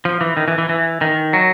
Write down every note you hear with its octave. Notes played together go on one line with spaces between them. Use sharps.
F3
E3
D#3
E3
E3
E3
D#3
F#3